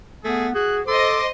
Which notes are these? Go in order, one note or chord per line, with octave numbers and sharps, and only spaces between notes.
A3 B3 G#4
F#4 G#4 F#6
A4 C5 D#5 C6 D6